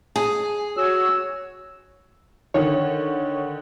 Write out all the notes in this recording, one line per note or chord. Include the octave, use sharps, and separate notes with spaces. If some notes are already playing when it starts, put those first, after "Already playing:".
G#4
F#4 C#5 E6
D3 D#3 C#5